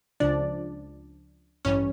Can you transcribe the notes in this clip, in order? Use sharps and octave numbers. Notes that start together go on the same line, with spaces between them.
C#2 C#3 F3 D4 D5
A1 G2 E3 G3 C#4 C#5